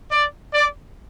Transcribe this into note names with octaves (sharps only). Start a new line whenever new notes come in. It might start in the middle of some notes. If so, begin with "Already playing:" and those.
D5
D5